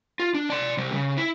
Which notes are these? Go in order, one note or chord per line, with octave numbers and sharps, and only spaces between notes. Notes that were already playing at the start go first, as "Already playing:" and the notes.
F4
D4
D5 C6
C3 G3
C#3
E4